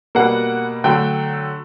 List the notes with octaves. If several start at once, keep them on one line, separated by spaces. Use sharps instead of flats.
B2 G3 A#3 F#5
D3 F#3 A3 G5